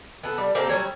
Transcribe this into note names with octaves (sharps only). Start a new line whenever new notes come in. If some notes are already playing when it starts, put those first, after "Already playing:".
B3 A4
G3
A#3 C4 G4 A4
F#3 G3 C#5